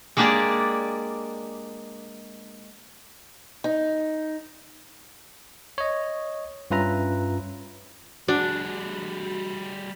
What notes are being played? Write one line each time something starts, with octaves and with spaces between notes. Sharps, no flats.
G#3 A#3 D4 G4 G#4 D5
D#4
C#5 D#5
G2 C#4 F4 B4 E5 A#5
G3 D4 F#4 G#4